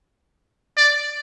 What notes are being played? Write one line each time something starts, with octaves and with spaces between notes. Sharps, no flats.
D5